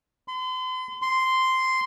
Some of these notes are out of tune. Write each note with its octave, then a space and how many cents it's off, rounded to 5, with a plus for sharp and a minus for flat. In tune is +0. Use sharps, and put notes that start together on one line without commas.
C6 -40
C6 -5